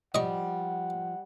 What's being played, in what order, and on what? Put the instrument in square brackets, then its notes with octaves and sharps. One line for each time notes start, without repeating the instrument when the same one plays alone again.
[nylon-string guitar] F3 [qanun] G3 [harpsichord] D#5 C#6 [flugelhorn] F#5